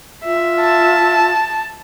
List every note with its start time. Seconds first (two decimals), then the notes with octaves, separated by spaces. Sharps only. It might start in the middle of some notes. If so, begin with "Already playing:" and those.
0.24 F4 E5
0.61 A5